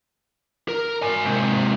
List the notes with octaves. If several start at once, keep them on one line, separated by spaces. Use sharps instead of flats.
A#4
A#4 G#5
G#2 C3